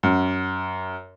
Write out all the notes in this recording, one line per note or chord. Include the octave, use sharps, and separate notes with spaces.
F#2